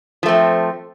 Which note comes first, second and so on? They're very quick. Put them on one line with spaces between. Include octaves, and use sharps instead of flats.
F3 A3 C4